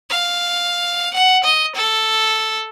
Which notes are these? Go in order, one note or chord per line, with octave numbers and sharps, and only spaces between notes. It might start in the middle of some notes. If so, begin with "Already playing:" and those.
F5
F#5
D#5
A4